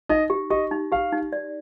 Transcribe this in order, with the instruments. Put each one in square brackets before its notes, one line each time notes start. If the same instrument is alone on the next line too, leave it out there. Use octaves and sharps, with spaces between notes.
[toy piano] D#4 [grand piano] D#5
[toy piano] G4
[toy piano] G4 [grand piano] D#5
[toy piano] D#4
[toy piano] G4 [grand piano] F5
[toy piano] D#4
D5